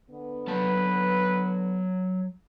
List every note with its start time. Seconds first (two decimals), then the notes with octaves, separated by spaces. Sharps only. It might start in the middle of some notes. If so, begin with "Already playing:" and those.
0.10 D3 B3
0.47 F#3 B4 A5